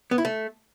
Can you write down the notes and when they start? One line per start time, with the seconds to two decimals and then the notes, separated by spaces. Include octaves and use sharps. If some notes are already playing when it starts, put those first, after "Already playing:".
0.11 B3
0.18 E4
0.25 A3